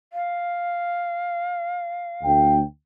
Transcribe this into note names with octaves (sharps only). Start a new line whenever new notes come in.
F5
D2 G5